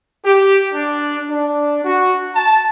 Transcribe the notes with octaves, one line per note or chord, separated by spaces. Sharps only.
G4
D4
D4
F#4
A5